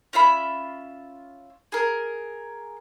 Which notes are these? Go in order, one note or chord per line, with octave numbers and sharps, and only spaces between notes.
C#4 F4 E5 B5
G#4 A#4